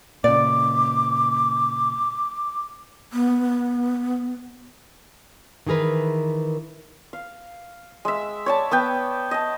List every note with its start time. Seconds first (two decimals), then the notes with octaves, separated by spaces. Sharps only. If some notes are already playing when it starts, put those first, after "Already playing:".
0.24 A#2 C#3 D5 D6
3.13 B3
5.67 D#3 E3 G#4 A#4 B4
7.13 F5
8.05 G#3 E5
8.46 C#5 D5 A5
8.71 B3 B4 G5
9.31 D#5 A5